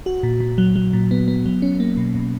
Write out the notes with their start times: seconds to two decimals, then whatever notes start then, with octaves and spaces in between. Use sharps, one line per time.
0.06 F#4
0.23 A#2
0.40 A#2
0.58 F#3
0.76 F#3
0.93 A#2
1.11 B3
1.28 B3
1.46 F#3
1.62 C#4
1.80 A#3
1.97 B2
2.15 B2